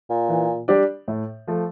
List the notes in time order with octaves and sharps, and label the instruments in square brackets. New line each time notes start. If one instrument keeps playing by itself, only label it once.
[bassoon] A#2
[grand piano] E3
G3 D4 G4 D5
A2
F3 A3